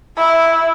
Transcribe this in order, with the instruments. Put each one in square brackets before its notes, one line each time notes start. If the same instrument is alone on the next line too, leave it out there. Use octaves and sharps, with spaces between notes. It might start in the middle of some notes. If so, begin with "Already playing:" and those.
[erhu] E4